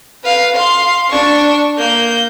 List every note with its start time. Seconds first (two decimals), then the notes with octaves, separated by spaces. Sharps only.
0.24 B4 F5
0.55 F5 C6
1.10 D4 C#6
1.78 A#3 G6